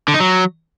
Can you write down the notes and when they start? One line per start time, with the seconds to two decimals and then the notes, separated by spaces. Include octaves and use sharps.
0.08 D3
0.14 D#4
0.20 F#3